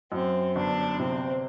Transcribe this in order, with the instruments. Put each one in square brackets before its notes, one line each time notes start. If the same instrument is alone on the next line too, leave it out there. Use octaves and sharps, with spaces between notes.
[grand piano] F#2 [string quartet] C4
[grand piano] G1 [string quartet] D4
[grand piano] C3 [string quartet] C4